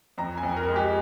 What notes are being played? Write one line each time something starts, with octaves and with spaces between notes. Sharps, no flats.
F2 A#5
G#5
F2
A#4
G#3
G4